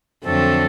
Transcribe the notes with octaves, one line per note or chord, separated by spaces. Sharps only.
F2 D3 F#3 A3 C4 A4